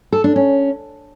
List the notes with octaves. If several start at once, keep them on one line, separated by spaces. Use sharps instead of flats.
A4
D4
C#4